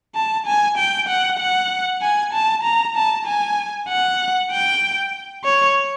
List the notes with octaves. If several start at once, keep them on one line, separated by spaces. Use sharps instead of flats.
A5
G#5
G5
F#5
F#5
G#5
A5
A#5
A5
G#5
F#5
G5
C#5